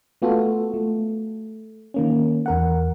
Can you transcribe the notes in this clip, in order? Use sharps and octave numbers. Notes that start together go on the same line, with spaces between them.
A3 B3 F4 F#4 A4
A3
D#3 A#3 C#4
E2 A#4 F#5